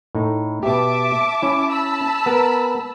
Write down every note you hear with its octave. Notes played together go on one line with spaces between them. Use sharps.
A2 D#4
B2 G4 E5 A5 D6
C#4 E4
A5 B5 E6
B3 A#4